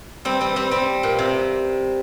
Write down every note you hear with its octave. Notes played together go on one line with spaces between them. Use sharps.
G3 C4
G3 C4
G3 C4
G3 C4
A#2
C3